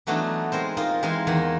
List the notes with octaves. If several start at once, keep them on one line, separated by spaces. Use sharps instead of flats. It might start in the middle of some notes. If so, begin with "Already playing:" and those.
E3 F#3 A3 B3 D4 D#4
G#3 C4 A#4 C5
A#3 D#4 F4
E3 G#3 C4 A#4 F5 G#5
E2 D#3 A#5